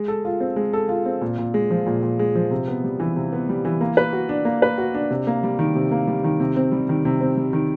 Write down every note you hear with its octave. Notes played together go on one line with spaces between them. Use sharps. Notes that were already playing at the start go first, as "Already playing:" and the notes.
Already playing: G#3
A4
F4
C4
G#3
A4
F4
C4
A#2
A#2
G#3
F3
A#2
A#2
G#3
F3
C3
B3
G3
E3
C3
B3
G3
E3
A#3
B4
F#4
D4
A#3
B4
F#4
D4
C3
A#3
G3
D#3
C3
A#3
G3
D#3
C3
C4
G3
D#3
C3
C4
G3
D#3